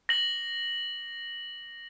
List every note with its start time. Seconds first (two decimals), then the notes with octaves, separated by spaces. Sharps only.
0.09 A#6 F#7